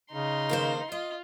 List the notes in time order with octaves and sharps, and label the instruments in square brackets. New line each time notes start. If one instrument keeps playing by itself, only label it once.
[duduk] C#3 [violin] D#4 C6
[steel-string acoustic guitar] D#3 A#3 C5
[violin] F4 [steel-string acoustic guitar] D#5